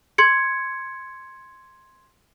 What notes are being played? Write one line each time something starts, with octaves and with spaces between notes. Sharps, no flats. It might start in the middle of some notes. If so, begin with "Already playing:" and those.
C6 G#6 C#7